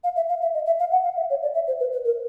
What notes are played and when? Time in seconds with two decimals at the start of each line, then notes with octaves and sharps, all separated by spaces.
0.04 F5
0.16 E5
0.29 F5
0.42 E5
0.54 D#5
0.66 E5
0.80 F5
0.92 F#5
1.04 F5
1.17 E5
1.30 C#5
1.43 D5
1.55 E5
1.68 C5
1.80 B4
1.92 B4
2.05 A#4